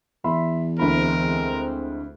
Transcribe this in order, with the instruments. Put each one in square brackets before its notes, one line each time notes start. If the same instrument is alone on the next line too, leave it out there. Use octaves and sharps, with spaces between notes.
[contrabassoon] E2 [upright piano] E5 B5 C6
[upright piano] D2 E4 B5 [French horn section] G#3 C4 [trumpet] A#4